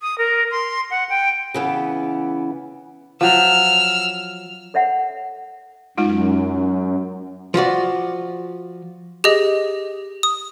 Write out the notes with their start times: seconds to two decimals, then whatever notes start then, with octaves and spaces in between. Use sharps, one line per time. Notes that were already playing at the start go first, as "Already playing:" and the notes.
0.01 D#6
0.18 A#4
0.51 C6
0.91 F#5
1.09 G5
1.54 C#3 E3 B3
3.21 F3 F#3 E6 F6
4.74 A4 C#5 E5 F#5
5.98 F#2 G#3 D#4 F4
7.54 F3 F4 F#4 D5
9.24 G4 G#4 D#5
10.23 D#6